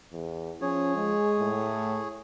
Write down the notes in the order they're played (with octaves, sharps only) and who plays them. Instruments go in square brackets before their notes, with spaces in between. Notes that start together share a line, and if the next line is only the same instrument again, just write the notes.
[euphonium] E2
[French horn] F3 [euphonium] C#4 [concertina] G#4 C#5
[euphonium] G#3
[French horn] A2
[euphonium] A3